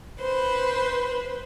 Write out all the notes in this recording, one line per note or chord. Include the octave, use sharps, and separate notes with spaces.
B4 C5